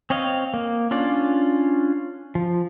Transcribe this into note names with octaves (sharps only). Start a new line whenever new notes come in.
C4 C#5 D#5 F5
A#3
C#4 D4 F4 D5
F3